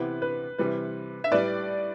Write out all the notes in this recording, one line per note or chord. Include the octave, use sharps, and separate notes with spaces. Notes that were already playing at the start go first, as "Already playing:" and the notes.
Already playing: C3 E3 B3 E4 G4 B4
B4
C3 E3 G3 B4
E5
A2 G3 B4 D5